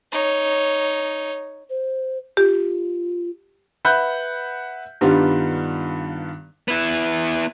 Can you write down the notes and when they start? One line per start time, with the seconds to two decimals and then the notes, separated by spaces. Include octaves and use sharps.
0.12 D#4 C#5
1.70 C5
2.37 F4 G4
3.85 B4 E5 F#5 B5 F#6 G6
5.01 G2 D#3 G3 B3 D4 F4
6.68 B3 E4